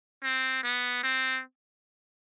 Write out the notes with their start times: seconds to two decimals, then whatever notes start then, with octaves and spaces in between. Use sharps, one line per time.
0.24 C4
0.64 B3
1.03 C4